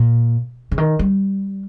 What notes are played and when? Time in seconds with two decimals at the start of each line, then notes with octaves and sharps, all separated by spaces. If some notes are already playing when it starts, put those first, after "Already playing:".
Already playing: A#2
0.72 C#3
0.78 D#3
0.99 G3